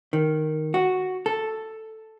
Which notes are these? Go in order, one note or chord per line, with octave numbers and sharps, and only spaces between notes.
D#3
F#4
A4